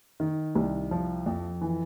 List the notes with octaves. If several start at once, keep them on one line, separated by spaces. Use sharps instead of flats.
D#3
C2
F3
F2
E3